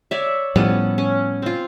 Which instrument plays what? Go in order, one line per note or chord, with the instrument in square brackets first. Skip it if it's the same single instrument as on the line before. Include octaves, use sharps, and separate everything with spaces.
[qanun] C#5 D5 E5
[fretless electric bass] A2 F3 G3 [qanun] B3 C#4 A4
[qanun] C#4
C4 F4